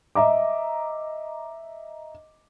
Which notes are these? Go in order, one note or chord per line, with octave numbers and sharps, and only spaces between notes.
D#5 E5 A#5 D6